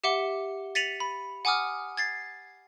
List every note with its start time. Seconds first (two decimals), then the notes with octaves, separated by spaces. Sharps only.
0.03 G4 E5 F#5 D6 C#7 G7
0.75 A6 B6 C#7 D#7 F7 F#7
1.00 B5
1.45 F#5 G#5 D6 D#6 F6
1.97 G#6 A6 C7